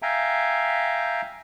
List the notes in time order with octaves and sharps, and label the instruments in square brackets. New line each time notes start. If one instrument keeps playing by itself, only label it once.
[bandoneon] E5 F5 G5 G#5 A#5